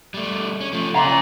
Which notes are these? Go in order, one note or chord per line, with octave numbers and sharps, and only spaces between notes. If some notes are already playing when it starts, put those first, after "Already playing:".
G3 A3
C#4
F3 A3
C#3 C#4 A#5 C6